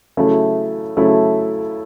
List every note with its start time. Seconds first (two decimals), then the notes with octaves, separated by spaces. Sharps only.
0.17 C#3 F#3 A3 E4 A4
0.97 C#3 F#3 A3 E4 A4